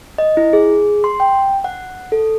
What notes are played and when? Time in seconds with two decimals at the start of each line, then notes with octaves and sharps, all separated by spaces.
0.18 D#5
0.37 E4
0.53 G#4
1.04 C6
1.20 G5
1.64 F#5
2.12 A4